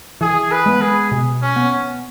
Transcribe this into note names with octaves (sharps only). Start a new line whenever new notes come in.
E3 G#4
B4
G#3 B3
G#4
B2
C#4
B3